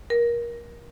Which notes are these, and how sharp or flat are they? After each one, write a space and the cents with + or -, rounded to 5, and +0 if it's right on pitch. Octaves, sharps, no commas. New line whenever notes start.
A#4 +25